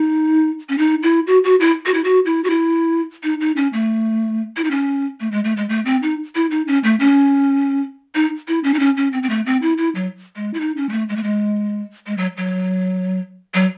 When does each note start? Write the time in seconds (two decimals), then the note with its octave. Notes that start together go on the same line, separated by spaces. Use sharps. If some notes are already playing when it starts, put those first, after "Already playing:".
Already playing: D#4
0.69 C#4
0.78 D#4
1.03 E4
1.27 F#4
1.44 F#4
1.60 E4
1.86 F#4
1.94 E4
2.04 F#4
2.26 E4
2.44 F#4
2.50 E4
3.23 D#4
3.41 D#4
3.56 C#4
3.73 A3
4.57 E4
4.64 D#4
4.71 C#4
5.20 A3
5.32 G#3
5.44 A3
5.57 G#3
5.69 A3
5.85 C4
6.03 D#4
6.35 E4
6.51 D#4
6.68 C#4
6.84 A3
7.00 C#4
8.15 D#4
8.48 E4
8.64 C#4
8.74 D#4
8.79 C#4
8.97 C#4
9.13 C4
9.23 C4
9.30 A3
9.46 C4
9.62 E4
9.78 E4
9.95 F#3
10.36 G#3
10.54 E4
10.60 D#4
10.77 C#4
10.89 G#3
10.92 A3
11.09 G#3
11.16 A3
11.23 G#3
12.07 G#3
12.18 F#3
12.37 F#3
13.54 F#3